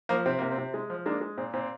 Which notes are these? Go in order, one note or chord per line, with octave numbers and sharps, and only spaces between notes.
F3 A#3
C3 C4
C3 A#3
C4
C3
G#3
F3
G#3 A#3 D4
G#3
A#2 C4
A#2 C4